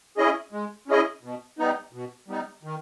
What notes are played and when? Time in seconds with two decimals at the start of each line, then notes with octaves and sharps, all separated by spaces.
0.17 C#4 E4 G#4 D#5
0.52 G#3
0.88 C#4 E4 G#4 D#5
1.23 B2
1.59 G3 B3 D#4
1.93 B2
2.28 G3 B3 D#4
2.63 D#3